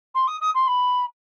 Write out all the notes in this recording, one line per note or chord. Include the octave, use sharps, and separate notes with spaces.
C6
D#6
D#6
C6
B5